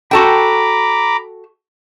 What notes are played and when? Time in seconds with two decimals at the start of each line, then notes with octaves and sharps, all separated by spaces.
0.11 F#4 A4 G5 A#5 B5 D6